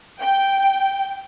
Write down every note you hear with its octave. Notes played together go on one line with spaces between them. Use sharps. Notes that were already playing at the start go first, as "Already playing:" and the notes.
G5